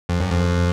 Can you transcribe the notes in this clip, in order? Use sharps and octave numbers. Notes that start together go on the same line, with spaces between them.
F2
F#2
F2